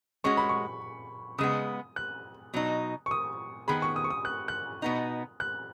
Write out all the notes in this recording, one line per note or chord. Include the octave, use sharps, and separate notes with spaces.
G#3 C#4 F#4 C#6
B5
C#6
C#3 G#3 B3 D#6
F#6
B2 F#3 D#4
C#6
D#6
D#3 B3 G#4 B5
C#6
D#6
C#6
D#6
F#6
F#6
B2 B3 D#4
F#6